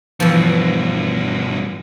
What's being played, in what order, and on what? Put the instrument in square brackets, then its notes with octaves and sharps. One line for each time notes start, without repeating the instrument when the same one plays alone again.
[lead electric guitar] G2 B2 [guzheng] E3 F3